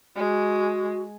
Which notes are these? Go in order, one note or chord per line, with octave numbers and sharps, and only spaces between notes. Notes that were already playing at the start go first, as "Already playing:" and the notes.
G#3 F#4